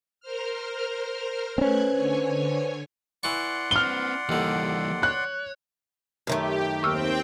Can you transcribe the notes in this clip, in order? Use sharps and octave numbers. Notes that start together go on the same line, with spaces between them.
A#4 C5 F6
A3 C4 C#4 B4 C5 F#6 G#6
D3 C#5 G#5
E3 D5 F#5 C6 C#6
C4 B4 F6 G7
D#2 D3 E3 G3
C#5 F#6
F#2 D#3 A3 G4
D#2 C4 G5 C#6 E6 F6